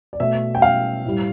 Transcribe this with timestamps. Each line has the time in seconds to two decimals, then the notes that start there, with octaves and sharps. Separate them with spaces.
0.13 D5
0.20 B2 A3 E5
0.55 G5
0.62 F5
1.05 A2 G3